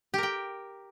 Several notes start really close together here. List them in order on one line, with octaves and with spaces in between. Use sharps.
G4 A#4 G5